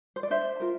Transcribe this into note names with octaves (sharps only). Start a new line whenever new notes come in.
C5
D5
D4 C5 E5
F4 A#4